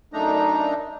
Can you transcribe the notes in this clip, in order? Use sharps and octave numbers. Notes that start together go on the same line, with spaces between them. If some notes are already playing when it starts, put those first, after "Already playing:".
F#2 A3 D4 D#4 A#5